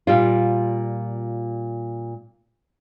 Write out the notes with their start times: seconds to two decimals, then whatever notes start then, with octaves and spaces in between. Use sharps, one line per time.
0.07 A#2 G3 F4